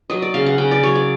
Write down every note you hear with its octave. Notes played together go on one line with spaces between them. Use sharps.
F#3 D#5
D5
C#3 F5
F#5
C#3 G5
D5
F#3 C#5
D5